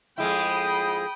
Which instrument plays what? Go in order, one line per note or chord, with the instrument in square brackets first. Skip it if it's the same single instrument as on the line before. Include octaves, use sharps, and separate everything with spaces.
[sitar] F2 G#3 E4 [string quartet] G5 B5 D#6